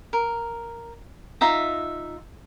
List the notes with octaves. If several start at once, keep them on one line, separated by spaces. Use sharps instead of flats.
A#4
D#4 F4 E5 A#5